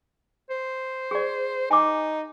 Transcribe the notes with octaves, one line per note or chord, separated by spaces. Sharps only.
C5
G#4 D5
D#4 G#5 D6